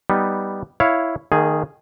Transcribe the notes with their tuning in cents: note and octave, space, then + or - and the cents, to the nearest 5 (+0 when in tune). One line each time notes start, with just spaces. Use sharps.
G3 +0 B3 +0 D#4 +0
E4 +0 C#5 +0 F5 +0
D#3 -10 A3 +45 G#4 +0